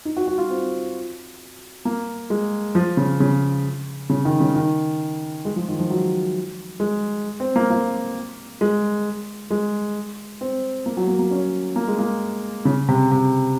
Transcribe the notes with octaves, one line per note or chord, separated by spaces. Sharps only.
D#4
F#4
F#4
F4
C4
A#3
G#3
F3
C#3
C#3
C#3
D#3
C#3
D#3
G#3
F3
D#3
F3
F#3
G#3
C4
A#3
A#3
G#3
G#3
C4
A#3
F#3
A#3
A#3
C#4
A#3
G#3
A#3
C#3
C3
C3